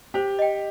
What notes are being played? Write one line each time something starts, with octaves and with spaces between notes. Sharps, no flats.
G4 C5
D#5 G5